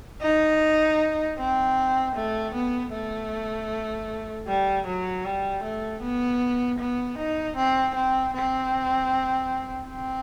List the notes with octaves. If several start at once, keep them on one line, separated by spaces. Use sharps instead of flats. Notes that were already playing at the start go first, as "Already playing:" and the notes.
D#4
C4
A3
B3
A3
G3
F#3
G3
A3
B3
B3
D#4
C4
C4
C4
C4